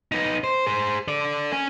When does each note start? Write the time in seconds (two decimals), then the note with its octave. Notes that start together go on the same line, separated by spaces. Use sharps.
0.12 B3 D#4
0.44 C5
0.66 G#4 C5
1.08 A4 D5
1.53 C#4 G#5